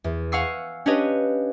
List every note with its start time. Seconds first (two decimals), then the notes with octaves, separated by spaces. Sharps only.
0.04 E2
0.32 F5 F#5 G#5 C#6 E6 C7
0.86 C#4 D4 G4 B4 C#5 D#5